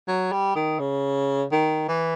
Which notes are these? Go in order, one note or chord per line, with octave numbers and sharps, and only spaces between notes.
F#3
G3
D#3
C#3
D#3
E3